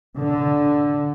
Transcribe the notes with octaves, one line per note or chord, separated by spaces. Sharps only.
D3